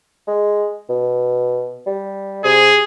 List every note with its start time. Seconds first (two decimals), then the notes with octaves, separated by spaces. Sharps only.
0.27 G#3
0.89 B2
1.86 G3
2.44 C3 G#4